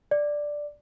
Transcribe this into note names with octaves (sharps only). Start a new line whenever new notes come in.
D5